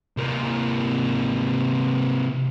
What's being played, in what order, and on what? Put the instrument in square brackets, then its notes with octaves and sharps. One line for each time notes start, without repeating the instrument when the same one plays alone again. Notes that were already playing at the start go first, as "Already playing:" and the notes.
[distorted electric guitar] C3 A#3